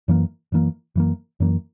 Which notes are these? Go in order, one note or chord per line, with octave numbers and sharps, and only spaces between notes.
F#2 E3 A#3
F#2 E3 A#3
F#2 E3 A#3
F#2 E3 A#3